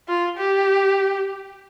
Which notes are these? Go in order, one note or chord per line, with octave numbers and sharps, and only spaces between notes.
F4
G4